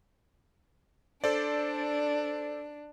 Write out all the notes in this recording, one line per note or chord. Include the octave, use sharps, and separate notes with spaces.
D4 A4 C5 D5